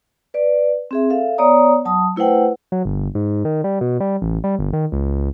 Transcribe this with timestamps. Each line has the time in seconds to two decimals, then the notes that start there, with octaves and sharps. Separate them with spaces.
0.34 B4 D5
0.91 C4 G#4 E5
1.10 A4 E5 F5
1.38 B3 C#5 D5 A#5 D#6
1.85 F#3 A5 D#6
2.16 A3 E4 B4 C5 F#5 G5
2.72 F#3
2.85 G1
3.15 G#2
3.45 D#3
3.64 G3
3.81 B2
4.00 G3
4.22 A1
4.44 G3
4.59 G1
4.73 D#3
4.92 C#2